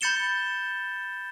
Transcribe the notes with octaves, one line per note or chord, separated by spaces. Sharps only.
B5 G6 A6 C#7 E7 G7